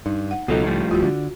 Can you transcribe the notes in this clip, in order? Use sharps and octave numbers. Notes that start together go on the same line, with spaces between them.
G2 D#4
F#5
C#2 B2 F#3 D#4 F4 A4
A2 F3 G3
D1 F4 F#4
D3